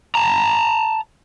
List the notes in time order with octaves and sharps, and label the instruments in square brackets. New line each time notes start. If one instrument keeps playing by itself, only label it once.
[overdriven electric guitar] A5 A#5